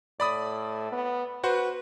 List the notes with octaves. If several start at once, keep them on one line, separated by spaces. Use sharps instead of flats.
A2 D5 B5 D#6
B3
F#4 B4 C5 F#5